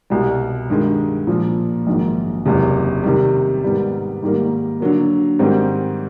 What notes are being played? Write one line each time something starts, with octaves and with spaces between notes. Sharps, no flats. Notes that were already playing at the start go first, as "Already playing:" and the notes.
C2 B2 G3
G2 D#3 G#3
A#2 F3 A#3
A#1 G#2 D#3 F#3
F#1 E2 C3
C3 D#3 G3
G#2 D#3 G3 B3
G#2 D#3 G3 A#3
D3 F#3 A#3
G#2 D#3 G3 C4